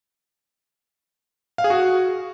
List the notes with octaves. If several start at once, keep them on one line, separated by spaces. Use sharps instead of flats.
F5
G#4
F#4